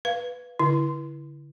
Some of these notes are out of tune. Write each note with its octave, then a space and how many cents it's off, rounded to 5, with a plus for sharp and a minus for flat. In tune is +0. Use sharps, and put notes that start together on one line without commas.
B4 +0 F5 +0
D3 -30 E4 +0